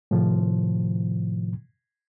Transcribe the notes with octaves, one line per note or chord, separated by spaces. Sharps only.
A2 C3 D#3 F3